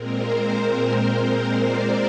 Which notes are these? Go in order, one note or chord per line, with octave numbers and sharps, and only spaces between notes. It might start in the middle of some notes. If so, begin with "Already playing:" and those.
Already playing: A#2 G#3 C4 A#4
C5
D5